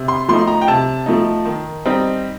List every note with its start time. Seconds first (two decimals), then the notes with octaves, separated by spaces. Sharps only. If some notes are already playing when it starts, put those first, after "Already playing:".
Already playing: C3
0.08 C6
0.29 F3 A3 D#4 C6
0.47 A#5
0.62 G5
0.68 C3 A5
1.06 F3 A3 D#4
1.45 D#3
1.86 G3 C4 D#4